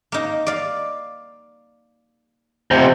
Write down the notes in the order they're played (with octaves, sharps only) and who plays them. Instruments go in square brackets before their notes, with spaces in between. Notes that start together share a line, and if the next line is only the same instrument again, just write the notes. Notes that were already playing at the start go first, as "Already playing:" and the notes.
[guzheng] A#3 D#4
D5 F5
[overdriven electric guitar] F2 C3 [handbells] C5